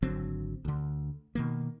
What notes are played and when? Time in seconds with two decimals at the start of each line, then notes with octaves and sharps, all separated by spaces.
0.02 G#1 D3 F#3 C4
0.65 D2 D3
1.35 B2 D#3 A#3